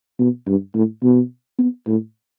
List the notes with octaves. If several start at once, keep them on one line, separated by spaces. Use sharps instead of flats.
B2
G2
A2
B2
B3
A2